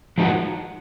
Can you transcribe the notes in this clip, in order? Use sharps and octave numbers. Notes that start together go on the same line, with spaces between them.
F3 G#3 D#4 F#4